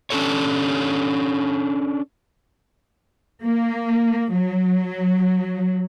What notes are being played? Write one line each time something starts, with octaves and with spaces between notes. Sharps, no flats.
C#4 D4 A4 C#5
A#3
F#3